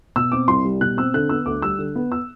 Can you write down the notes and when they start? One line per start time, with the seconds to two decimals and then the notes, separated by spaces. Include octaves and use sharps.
0.16 B2 E6
0.32 C4 D6
0.48 C2 C6
0.65 G3
0.81 B2 F#6
0.97 C4 E6
1.14 D3 F#6
1.29 B3 E6
1.46 D2 D6
1.62 G3 E6
1.78 D3
1.95 B3
2.12 E6